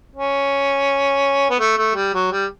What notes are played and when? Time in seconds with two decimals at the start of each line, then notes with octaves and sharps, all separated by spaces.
0.16 C#4
1.50 B3
1.60 A3
1.78 A3
1.95 G3
2.14 F#3
2.32 G3